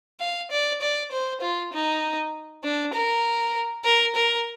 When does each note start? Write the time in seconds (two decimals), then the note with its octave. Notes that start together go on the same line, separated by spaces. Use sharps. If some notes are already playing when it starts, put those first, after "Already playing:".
0.20 F5
0.51 D5
0.82 D5
1.12 C5
1.41 F4
1.73 D#4
2.64 D4
2.94 A#4
3.84 A#4
4.15 A#4